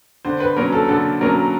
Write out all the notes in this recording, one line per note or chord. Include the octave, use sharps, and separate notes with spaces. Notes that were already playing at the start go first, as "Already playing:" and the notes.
D3 C5
B4
F#3 A#3 C#4 A#4
A4
D3 A4
F#3 A#3 C#4 A#4